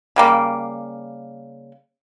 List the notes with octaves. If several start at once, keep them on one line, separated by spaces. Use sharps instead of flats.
C#3 G3 A#3